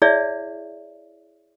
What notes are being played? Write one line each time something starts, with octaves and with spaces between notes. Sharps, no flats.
E4 G#4 C#5 D5 E5